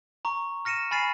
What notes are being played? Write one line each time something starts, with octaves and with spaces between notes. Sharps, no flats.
A#5 C#6
F6 A#6 C#7 D#7 E7
G#5 B5 F6 A6 C7 D#7